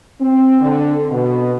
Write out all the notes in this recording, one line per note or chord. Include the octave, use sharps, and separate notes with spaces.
C4
D3
B2